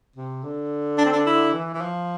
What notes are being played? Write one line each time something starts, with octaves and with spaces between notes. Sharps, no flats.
C3
D3
D4
C4
D4
E4
E3
E3
F3